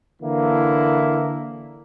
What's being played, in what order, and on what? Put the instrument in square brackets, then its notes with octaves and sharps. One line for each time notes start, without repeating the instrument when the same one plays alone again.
[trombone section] D3 E3 A#3 E4